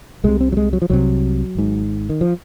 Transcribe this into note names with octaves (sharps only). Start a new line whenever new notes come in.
C2 C3 G#3
C4
F#3
G#3
F#3
F3
C2 C3 F#3
G#1 G#2
D#3
F3